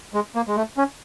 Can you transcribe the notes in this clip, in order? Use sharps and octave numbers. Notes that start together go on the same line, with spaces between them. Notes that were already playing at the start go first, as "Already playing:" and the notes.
G#3
A#3
G#3
A3
C#4